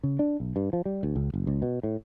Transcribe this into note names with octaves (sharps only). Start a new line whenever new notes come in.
C#3
D4
B1
G2
F3
G3
D2
C#2
F#1
C#2
B2
A2